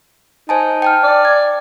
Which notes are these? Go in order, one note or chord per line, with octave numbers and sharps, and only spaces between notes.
D#4 C5 G#5 A5
G5 A5 F6
D5
G#6